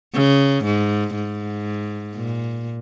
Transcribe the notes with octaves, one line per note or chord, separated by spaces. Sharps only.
C#3
G#2
G#2
A#2